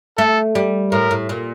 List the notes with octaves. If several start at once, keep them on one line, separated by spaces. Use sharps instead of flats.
A3 A4
G3
A2 A#4
A2
A#2